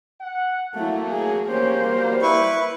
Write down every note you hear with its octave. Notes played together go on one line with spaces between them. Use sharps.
F#5
F#3 A3 A#3 E4
G#4
A#3 C#4 G4 C5 C#5
F#3 G3
E4 B4 C#6